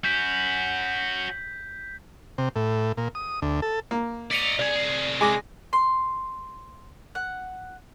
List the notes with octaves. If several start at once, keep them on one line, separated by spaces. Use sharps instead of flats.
C#4 F#4 G6 B6
C3
A2
A#2
D#6
D2
A4
A#3
D5 D#5 B6 C#7 F7
C2 G#4 D5
G#3 G#5 D6 A#6
C6
F#5